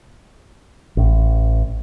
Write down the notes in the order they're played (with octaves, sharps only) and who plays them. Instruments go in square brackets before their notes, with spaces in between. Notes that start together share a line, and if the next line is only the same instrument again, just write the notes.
[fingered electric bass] A1